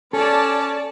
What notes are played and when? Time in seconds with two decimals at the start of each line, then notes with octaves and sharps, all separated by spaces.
0.13 C#4 A4 D5 A5